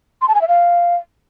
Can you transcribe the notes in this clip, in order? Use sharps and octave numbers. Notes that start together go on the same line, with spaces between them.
C6
A5
G#5
E5
F5